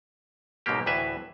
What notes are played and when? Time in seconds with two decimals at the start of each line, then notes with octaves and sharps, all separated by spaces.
0.66 B1 G#2 B2 F#3 A#3 G4
0.86 D2 A2 E3 B4 E5